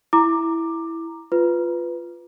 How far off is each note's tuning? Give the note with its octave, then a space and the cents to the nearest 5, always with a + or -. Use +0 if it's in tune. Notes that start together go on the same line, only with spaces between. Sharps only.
E4 +0 A#5 +0 D6 +10
F4 +0 B4 +5